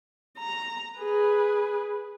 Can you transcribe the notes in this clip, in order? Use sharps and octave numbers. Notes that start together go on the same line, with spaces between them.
A#5
G#4 B4